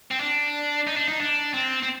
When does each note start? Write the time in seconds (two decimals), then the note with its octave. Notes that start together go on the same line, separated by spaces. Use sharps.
0.11 C4
0.20 D4
0.87 D#4
0.97 D4
1.08 D#4
1.21 D4
1.54 C4
1.83 C4